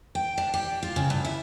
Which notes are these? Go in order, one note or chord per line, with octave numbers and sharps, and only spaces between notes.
G5
D4
G4
F4
C#3
G2
E4